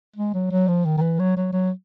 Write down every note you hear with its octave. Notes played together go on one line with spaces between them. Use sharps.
G#3
F#3
F#3
F3
D#3
D#3
E3
F#3
F#3
F#3